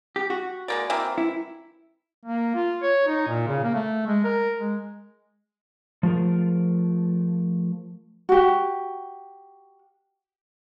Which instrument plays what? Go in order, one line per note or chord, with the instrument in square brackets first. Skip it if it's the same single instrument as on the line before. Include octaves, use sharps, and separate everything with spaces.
[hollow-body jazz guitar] G4
F#4
[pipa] G#3 A#3 D5
E3 A#3 C4
[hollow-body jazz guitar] E4
[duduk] A#3
F4
C#5
D#4
A#2
C#3
A#3
A3
G#3
A#4
G#3
[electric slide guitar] F3 A3 F4 G#4 A#4
[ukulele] F#4 G4